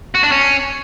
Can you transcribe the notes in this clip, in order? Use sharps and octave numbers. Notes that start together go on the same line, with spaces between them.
F#4
D4
C#4